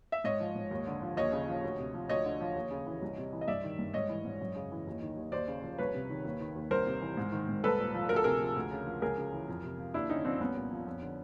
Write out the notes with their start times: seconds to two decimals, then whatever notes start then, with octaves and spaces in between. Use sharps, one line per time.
0.12 E5
0.24 G#2 C#5 D#5
0.40 F3
0.55 G#2
0.71 D#2
0.87 D3
1.02 F3
1.17 D#2 C#5 D#5
1.32 C#3
1.48 F3
1.64 D2
1.78 C3
1.94 F3
2.09 D2 C#5 D#5
2.25 D3
2.40 F3
2.55 D#2
2.71 C#3
2.86 E3
3.02 C2
3.18 C3
3.33 E3
3.41 D#5
3.47 G2 D5 E5
3.64 D#3
3.79 G2
3.94 G#2 C#5 D#5
4.09 E3
4.25 G#2
4.41 F#2
4.55 C#3
4.72 E3
4.87 D#2
5.02 D#3
5.17 D#2
5.32 D#2 C5 D5
5.48 C#3
5.63 F3
5.78 C2 B4 C#5
5.94 C3
6.09 D#3
6.24 D#2
6.40 D#3
6.56 D#2
6.71 C2 A#4 C5
6.86 C3
7.02 E3
7.17 G#2
7.32 D#3
7.49 G#2
7.63 C2 A4 B4
7.79 A#2
7.94 F3
8.09 D2 A#4
8.16 A4
8.24 C3 G#4 A#4
8.40 F3
8.56 D2
8.71 C#3
8.86 F3
9.02 C#2 G#4 A#4
9.18 C#3
9.32 E3
9.48 F2
9.63 C3
9.78 F3
9.94 D#2 D4 E4
10.09 D3 C#4 D#4
10.25 F3 C4 D4
10.40 C2 B3 C#4
10.55 A#2
10.71 F3
10.86 F2
11.02 D3